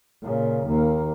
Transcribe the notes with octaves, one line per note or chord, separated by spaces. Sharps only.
A#2 C#3
D#2 A#3